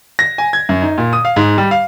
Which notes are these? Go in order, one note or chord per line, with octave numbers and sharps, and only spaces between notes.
A#6
G#5
G#6
F#2
D#4
A#2
D#6
F5
G#2
G3
F5